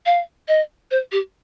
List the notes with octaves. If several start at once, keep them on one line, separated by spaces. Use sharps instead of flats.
F5
D#5
C5
G4